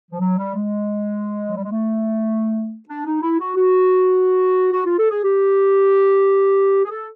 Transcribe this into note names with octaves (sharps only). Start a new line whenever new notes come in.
F3
F#3
G3
G#3
F#3
G3
G#3
A3
D4
D#4
E4
F#4
F#4
F#4
F4
A4
G#4
G4
G#4
A4